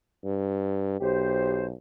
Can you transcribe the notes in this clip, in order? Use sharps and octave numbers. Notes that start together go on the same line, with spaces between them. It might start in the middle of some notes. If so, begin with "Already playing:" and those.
G2
B1 G4 C5